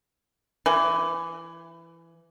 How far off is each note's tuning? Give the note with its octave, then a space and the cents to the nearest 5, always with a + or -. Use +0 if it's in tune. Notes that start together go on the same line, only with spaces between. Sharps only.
E3 +20